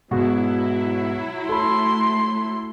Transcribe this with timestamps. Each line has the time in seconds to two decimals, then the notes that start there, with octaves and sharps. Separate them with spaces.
0.11 G#2 B2 F#3 E4 F#4
1.49 A3 A4 B5 C6